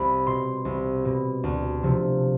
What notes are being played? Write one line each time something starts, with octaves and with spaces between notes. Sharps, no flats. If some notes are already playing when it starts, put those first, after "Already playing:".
Already playing: C2 B5
B2 C6
C2
B2
D2
C3 F3